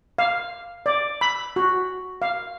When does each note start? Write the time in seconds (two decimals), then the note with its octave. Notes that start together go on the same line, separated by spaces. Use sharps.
0.18 F5
0.86 D5
1.21 B5
1.56 F#4
2.22 F5